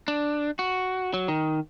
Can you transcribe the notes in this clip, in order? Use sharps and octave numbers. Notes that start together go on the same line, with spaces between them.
D4
F#4
F#3
D#3